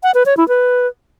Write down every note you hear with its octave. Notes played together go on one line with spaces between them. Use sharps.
F#5
B4
C#5
E4
B4